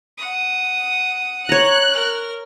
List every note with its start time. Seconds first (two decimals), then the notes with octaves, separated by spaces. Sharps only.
0.18 F#5 D#6
1.49 C#5 A#5 F#6
1.92 A#4 F6